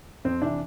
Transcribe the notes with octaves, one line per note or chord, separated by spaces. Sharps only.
F2 C4
C3 E3 D4